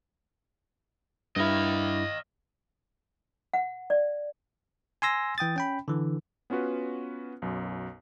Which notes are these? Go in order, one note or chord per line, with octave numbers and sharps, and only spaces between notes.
G2 E4 D#5 F5
F#5
D5
G#5 C6 E6 A#6
E3 G5 D#6 A6
C#4 G5 B5
D3 E3
B3 C#4 F4 F#4 B4
B1 F#2